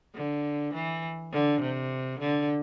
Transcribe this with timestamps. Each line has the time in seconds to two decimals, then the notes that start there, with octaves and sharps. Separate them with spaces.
0.15 D3
0.74 E3
1.33 D3
1.61 C3
2.20 D3